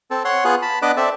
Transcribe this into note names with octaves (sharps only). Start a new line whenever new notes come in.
C4 A4
C#5 F#5 C6
B3 F4 G#4 F#6
A5 B5
B3 D4 B4 D#5 D6 F#6
C4 A4 D5 E5